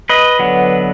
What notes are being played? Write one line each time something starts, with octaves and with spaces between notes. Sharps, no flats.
B4 D#5
D3 F#3 B3